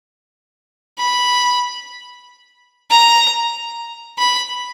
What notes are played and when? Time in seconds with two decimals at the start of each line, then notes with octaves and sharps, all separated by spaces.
0.99 B5
2.90 A#5
4.19 B5